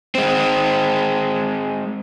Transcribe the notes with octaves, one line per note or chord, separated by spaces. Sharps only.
G#3 C4